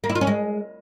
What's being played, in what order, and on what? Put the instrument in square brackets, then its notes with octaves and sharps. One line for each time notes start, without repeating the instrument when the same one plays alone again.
[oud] A#3
E4
F4
C#4
G#3